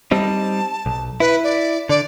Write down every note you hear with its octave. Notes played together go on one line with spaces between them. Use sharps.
G3 C4 D#4 A5
B1
E4 B4
D5
D3 D5